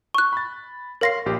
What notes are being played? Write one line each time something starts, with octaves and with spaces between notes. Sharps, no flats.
C#6 F#6
B5 A6
A#4 C#5 F5 C6 A#6 C7
A#1 G4